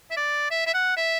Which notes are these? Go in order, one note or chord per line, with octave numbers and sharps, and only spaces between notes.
E5
D5
E5
E5
F#5
E5